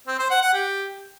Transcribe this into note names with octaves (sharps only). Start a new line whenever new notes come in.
C4
C5
F#5
F#5
G4